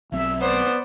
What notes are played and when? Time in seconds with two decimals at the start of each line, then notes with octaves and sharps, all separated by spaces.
0.12 B1 F#3 C4 E5
0.41 B3 C5 D5